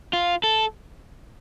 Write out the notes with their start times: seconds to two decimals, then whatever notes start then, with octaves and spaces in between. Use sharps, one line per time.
0.13 F4
0.44 A4